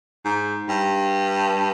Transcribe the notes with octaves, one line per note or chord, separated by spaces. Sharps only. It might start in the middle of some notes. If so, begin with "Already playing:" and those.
G#2
G2